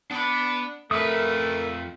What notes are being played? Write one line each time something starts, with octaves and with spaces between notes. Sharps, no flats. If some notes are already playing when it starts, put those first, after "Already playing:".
B3 D4 B5
F2 A3 A#4 B4 D#6